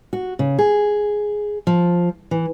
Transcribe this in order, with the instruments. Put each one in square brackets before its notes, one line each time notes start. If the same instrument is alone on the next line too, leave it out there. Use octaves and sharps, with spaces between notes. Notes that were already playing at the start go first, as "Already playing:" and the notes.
[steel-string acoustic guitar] F#4
C#3
G#4
F3
E3